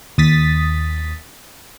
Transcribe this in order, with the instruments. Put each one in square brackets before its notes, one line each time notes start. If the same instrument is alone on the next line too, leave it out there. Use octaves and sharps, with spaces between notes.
[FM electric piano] D#2 D#6 A6 B6